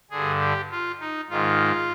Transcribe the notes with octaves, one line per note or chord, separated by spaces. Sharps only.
G2 D3 G#4
G4
F4
D#4
G#2 D#3 F4